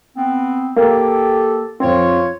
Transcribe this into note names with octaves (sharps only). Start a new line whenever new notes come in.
B3 C4
A#3 G4 A4
F2 C4 F4 C#5